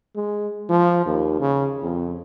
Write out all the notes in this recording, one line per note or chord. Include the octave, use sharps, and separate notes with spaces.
G#3
F3
D#2
C#3
F2